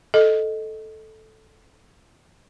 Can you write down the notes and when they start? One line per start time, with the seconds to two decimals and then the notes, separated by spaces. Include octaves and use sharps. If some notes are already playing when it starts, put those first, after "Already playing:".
0.14 A4 D#5